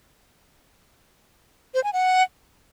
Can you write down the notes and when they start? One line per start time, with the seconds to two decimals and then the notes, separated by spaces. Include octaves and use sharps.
1.74 C5
1.84 G#5
1.93 F#5